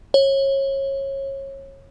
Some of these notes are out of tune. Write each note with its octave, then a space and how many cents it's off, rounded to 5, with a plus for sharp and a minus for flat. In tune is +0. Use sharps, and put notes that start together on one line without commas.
C#5 -25